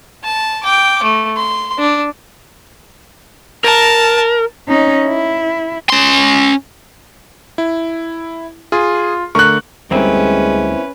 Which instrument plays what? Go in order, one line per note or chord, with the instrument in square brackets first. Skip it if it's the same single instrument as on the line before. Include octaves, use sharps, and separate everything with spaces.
[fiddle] A5
G5 D6
A3
C6
D4
[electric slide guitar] A#4 [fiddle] A5
[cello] C#4 D#4
E4
[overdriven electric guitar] C#4 C6
[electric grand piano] E4
[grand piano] F4 [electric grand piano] G#4
[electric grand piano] D3 A3 A#4 [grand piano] C#6 F#6
[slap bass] D2 G3 [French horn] G#3 [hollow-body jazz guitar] A#3 C4 E4 [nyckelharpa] C#4 B4